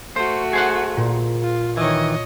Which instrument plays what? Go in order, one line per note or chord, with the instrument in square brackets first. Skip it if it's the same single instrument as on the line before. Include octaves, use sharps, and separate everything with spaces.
[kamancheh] A3 F#4 [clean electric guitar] C5
[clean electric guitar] G#4 C5 F#5
[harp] A#2
[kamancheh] F4
[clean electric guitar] D#3 E3 [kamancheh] C#5 D#5